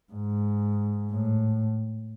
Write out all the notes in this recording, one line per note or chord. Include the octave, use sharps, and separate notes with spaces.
G#2
A2